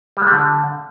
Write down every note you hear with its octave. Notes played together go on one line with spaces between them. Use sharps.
G3
G#3
G3
D3